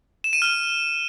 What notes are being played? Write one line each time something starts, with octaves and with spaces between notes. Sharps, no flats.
E7
D#7
F6